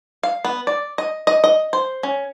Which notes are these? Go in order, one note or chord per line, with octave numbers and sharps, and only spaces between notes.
F5
B3
D5
D#5
D#5
D#5
C5
C#4